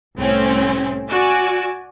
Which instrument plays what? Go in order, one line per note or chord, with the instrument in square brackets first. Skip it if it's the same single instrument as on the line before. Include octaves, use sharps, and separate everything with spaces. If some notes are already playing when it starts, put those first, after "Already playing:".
[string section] C2 A2 C4 C#4
F#4 D5 G#5 E6